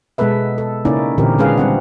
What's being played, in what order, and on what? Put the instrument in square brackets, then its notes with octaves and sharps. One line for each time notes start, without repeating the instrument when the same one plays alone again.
[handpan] B2 G#3 B3 A4 B4 E5
A4
C#3 A#3 C#4 D#4 E4 D5
A#2 D3 E3 C4 G4 A#4
G#3 C#4 D4 G#4 B4 F5
G3 C4 F#5